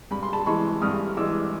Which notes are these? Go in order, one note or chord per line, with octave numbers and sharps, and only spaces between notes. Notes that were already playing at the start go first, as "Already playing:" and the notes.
G2 B5
C6
A5 B5
E3 G#3 B5 C#6
G2 D#6 F6
E3 G#3 D6 E6